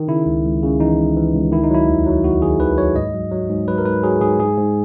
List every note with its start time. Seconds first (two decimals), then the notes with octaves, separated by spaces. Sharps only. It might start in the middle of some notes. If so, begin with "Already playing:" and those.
Already playing: D#3
0.08 C#3 E4
0.26 C#2
0.44 C#2
0.63 C#3
0.80 E3 D#4
0.99 C#2
1.17 E3
1.34 C#2
1.52 D#3 E4
1.64 D#4
1.70 F#3 E4
1.88 D#2
2.06 F#3
2.24 D#2 F#4
2.42 D#2 G#4
2.59 D#3 B4
2.78 F#3 C#5
2.95 G#2 D#5
3.14 F#3
3.32 F#3
3.49 G#2
3.68 F#3 B4
3.78 A#4
3.85 G#2 B4
4.03 F#3 G#4
4.21 G#2 G#4
4.40 G#2 G#4
4.58 G#2